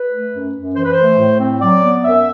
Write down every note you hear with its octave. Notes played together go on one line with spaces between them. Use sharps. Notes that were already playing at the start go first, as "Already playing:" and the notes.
Already playing: B4
A3
F#2
F#2
E3 C5
B4
A3 C5
A2
C4
F#3 D5
B3
F#2 E5